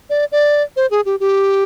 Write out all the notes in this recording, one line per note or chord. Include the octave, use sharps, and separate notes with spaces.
D5
D5
C5
G#4
G4
G4